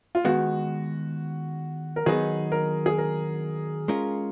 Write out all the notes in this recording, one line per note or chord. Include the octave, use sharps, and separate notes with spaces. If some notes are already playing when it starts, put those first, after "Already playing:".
F4
D#3 G#3 B3 F#4
A#4
D#3 F#3 B3 D#4 G#4
A#4
G#4
A#4
G#3 C#4 F4 A#4